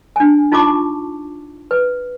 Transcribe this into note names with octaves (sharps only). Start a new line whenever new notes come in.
D4 G#5
D#4 F4 A5 C#6 D6
B4